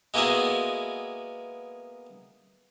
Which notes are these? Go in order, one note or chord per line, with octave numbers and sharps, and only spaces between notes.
G#3 A#3 B3 E4 F#4 G#4